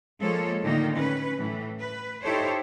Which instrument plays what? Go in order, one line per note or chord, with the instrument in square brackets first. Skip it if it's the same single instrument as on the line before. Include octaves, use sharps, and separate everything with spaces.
[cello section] F3 G#3 A#3 A4 C#5
A2 D3 D#3 A#3 D#4
C#4 B4
A2 E3
B4
D#4 E4 G4 A4 C5 C#5